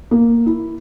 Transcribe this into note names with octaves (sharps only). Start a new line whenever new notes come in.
A#3
E4